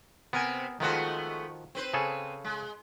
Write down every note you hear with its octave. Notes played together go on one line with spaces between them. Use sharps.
C3 B3 C4 A#4 G#5
D#3 F3 G#3 A3 B3 F#4
C4 B4 C5
C#3 G#4 A4
G#3